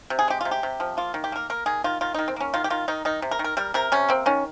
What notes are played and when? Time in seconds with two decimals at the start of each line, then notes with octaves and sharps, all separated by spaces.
0.10 C3
0.19 G#4
0.28 G#3 G4
0.41 C3 F4
0.51 G4
0.63 C3
0.80 F3
0.97 A#3 F4
1.14 D#3
1.24 G4
1.32 A#3 A#4
1.50 A#3 A#4
1.66 D#3 G#4
1.84 D#3 F4
2.01 D#3 F4
2.14 D#3 D#4
2.28 C4
2.36 A#3 C#4
2.54 D#3 F4
2.64 G4
2.70 D#3 F4
2.88 D#3 D#4
3.05 D#3 D#4
3.22 C3
3.31 A#4
3.39 D#3
3.44 A#4
3.57 G3 A#4
3.74 C3 A#4
3.92 C3 C#4
4.08 A#3 C4
4.26 D#3 C#4